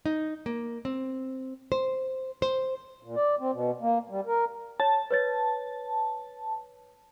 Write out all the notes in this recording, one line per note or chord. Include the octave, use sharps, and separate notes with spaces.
D#4
A#3
C4
C5
C5
A#2
D5
C4
B2
A#3
G3
A#4
C#5 A5
B4 C#5 A6